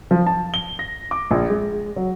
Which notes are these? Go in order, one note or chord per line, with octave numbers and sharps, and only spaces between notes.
F3
A5
G7
A#6
D6
A#1
G#3
F#3